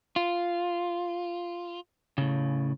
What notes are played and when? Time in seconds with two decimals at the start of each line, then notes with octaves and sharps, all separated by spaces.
0.16 F4
2.18 A2 C#3